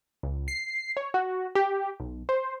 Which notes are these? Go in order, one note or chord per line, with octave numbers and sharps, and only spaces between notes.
C#2
C7
C#5
F#4
G4
B1
C5